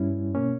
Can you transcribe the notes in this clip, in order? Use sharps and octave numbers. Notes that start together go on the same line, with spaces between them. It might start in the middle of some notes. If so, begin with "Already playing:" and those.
Already playing: G2 G3 C#4 E4
B2 A#3 C#4